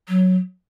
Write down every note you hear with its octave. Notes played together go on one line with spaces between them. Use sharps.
F#3